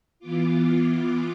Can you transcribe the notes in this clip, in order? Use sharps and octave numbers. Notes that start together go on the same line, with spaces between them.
E3 B3 F4 D6